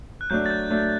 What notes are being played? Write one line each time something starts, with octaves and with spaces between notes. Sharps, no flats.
F#6
F#3 A3 D4 G6
A6
G6
F#3 A3 D4